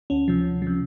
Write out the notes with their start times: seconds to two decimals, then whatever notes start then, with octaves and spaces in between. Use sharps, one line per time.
0.10 D2 C#4
0.28 C3 F3
0.45 D2
0.62 C3 F3